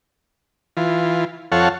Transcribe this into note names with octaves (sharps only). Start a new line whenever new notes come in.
E3 F4
F2 A4 C#5 F5 F#5